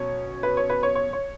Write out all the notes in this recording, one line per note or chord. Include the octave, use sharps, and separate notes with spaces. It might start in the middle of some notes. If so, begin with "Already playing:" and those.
Already playing: B2 F#3 C#4 C#5
B4
C#5
B4
C#5
C#5
C#5